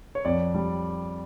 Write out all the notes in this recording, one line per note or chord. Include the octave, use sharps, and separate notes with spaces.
C#5
F2 D5
G3